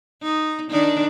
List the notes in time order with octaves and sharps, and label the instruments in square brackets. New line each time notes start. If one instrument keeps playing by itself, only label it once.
[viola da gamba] D#4
D#3 D4 D#4